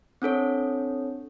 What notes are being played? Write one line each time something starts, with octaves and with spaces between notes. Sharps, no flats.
C4 D4 A4 C#5